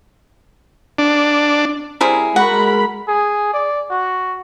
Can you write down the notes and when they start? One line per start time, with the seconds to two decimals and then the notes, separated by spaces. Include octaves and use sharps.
0.99 D4
2.01 G3 C4 E4 G#4 A#4
2.36 G#3 F#4 A#4 F#5 B5
3.08 G#4
3.53 D5
3.90 F#4